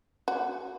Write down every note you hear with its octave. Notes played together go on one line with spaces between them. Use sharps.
F#4